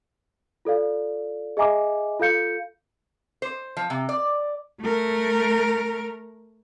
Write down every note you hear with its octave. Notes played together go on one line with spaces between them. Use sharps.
F4 A4 D5 F5
G#4 D#5 E5 G#5 A#5 D6
F4 A4 F5 G6 C#7
C5
F3
C3
D5
A3 A#4